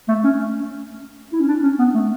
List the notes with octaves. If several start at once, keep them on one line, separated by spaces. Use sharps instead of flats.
A3
C#4
E4
C#4
D4
C#4
B3
A3